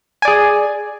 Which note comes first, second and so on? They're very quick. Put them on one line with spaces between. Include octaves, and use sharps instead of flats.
G#5 D5 G#4